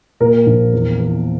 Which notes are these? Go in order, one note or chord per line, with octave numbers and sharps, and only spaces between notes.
A#2 A#4
A#1
E2
E2